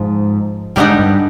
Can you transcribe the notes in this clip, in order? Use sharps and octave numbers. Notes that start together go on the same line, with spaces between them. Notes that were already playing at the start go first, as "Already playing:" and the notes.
Already playing: G#2 F3
G#2 D3 G3 B3 D#4 G4
G2